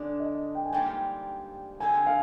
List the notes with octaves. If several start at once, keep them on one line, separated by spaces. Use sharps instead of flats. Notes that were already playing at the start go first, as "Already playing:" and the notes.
Already playing: D3 G#3 D4 D5
D#5
G5
G#5
G#2 G3 A#3 F4 G5
D3 G#3 C4 F4 G#5
F5